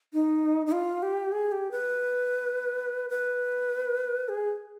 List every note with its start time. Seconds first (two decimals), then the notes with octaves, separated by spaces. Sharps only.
0.13 D#4
0.66 D#4
0.72 F4
1.03 G4
1.32 G#4
1.52 G4
1.71 B4
3.10 B4
4.29 G#4